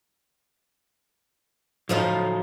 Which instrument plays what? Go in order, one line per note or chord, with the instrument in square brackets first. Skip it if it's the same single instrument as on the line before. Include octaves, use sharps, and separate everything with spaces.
[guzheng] A2 F3 D#4 [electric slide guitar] F#3 C5 F5